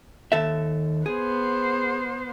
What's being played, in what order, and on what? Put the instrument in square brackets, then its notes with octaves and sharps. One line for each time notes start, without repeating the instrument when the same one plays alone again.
[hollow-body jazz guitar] D#2 A4 E5
[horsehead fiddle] B3 C5 [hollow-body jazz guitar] G#4